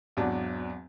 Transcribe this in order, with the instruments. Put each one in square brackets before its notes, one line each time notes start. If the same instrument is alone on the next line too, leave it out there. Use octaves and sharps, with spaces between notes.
[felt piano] G#1 E2 F#3 D4 F#4 A5